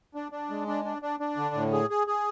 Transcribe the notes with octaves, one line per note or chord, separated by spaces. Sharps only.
D4
D4
G#3
D4
D4
D4
D4
D3
A2
G#4
G#4
G#4